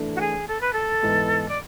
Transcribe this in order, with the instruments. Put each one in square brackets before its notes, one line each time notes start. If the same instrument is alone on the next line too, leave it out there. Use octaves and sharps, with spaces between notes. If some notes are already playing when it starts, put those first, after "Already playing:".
Already playing: [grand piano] E3 A3 D4 A4
[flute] F#4
G#4
A4
B4
A4
[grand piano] G#2 E3 B3
[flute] D5